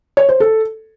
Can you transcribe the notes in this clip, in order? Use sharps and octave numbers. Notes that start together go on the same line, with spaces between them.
C#5
C5
A4